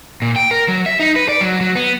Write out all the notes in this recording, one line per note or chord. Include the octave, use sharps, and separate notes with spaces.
A#2
G5
A#4
F#3
E5
D#4
B4
D5
F#3
F#3
B3